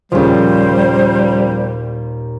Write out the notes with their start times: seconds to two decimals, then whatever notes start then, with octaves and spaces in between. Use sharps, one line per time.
0.12 D#2 A#2 C#3 F3 G3 C5